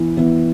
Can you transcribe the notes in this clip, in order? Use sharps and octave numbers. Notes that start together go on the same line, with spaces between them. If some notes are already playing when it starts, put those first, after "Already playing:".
Already playing: E3 B3 E4
E3 B3 E4